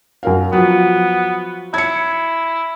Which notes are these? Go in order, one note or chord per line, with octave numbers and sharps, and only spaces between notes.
F#2 A#4 F5
F3 F#3 B3
E4 G#6 C#7